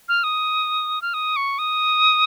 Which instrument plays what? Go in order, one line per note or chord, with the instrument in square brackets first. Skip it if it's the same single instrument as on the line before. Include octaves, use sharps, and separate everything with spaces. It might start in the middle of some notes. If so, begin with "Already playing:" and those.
[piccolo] F6
D#6
F6
D#6
C#6
D#6